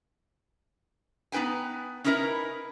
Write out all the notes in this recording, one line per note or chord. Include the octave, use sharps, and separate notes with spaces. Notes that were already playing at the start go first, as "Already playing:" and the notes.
B3 D#4 B4 G5 G#5
C#4 D#4 E4 A#4 B4